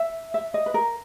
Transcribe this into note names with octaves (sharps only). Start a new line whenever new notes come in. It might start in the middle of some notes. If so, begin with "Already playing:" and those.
Already playing: E5
E5
D#5
B4
A#4